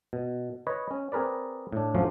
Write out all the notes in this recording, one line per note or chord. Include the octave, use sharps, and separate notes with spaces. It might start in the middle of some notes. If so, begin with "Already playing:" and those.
B2
B4 C#5 D#5
C#4
C4 G#4 A#4 B4 D5
A2 D4
F2 A2 F3 F#3 C#4 D4